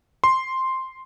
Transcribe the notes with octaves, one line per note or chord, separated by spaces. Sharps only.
C6